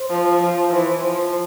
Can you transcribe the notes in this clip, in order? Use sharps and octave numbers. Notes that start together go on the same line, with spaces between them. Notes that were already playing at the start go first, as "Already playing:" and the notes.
Already playing: C5
F3
F3
E3
F3